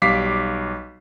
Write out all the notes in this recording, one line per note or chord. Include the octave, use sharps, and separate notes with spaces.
B1 G3 F5 D6 B6 C7